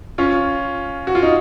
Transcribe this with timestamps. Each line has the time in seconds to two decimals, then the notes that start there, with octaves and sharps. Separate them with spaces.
0.18 C#4 F4
1.07 F#4
1.15 F4
1.23 D#4